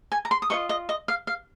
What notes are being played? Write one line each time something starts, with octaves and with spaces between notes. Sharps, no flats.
G#5
A#5
C6
D#6
F4 C5 D#5 C#6
D#5
D#5
F5
F5